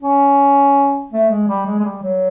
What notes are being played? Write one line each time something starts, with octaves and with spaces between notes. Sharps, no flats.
C#4
A3
G#3
G3
G#3
G#3
G3
F#3